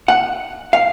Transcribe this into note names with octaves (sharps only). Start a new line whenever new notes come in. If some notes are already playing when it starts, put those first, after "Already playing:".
F#5
F5